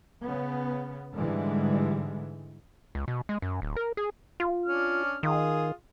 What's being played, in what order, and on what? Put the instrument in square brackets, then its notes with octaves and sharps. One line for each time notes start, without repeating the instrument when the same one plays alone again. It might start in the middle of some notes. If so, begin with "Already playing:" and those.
[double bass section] C#3 B3
G#2 D3 E3 G3 G#3
[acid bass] C#2
B2
G#3
F#2
D1
A#4
G#4
F4
[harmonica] C#4 D4 F6
[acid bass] D#3 [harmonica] F4 G#4 D#6